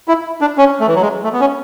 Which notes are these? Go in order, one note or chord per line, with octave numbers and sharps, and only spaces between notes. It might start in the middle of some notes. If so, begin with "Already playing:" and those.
E4
D4
C#4
A3
E3
F#3
G#3
A3
B3
C#4